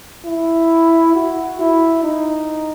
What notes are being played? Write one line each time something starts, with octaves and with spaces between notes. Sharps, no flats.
E4
F#4
E4
D#4